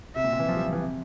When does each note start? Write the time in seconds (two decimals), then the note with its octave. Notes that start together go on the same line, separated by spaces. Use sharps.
0.16 C3 E5
0.24 A#2
0.32 C3
0.40 E3
0.48 F3
0.56 G3
0.65 F3
0.73 E3
0.81 C3